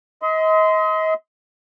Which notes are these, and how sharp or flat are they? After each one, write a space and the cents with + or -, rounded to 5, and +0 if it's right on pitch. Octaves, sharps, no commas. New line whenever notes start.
D#5 +35 C6 -25